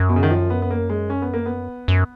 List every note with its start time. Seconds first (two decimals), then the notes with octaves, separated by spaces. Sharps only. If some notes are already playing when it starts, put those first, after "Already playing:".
Already playing: F#2
0.09 B2
0.16 C#3
0.23 D#3
0.30 F3
0.50 B3
0.62 B3
0.70 A#3
0.89 G#3
1.10 C#4
1.22 B3
1.33 A#3
1.46 B3
1.88 F#2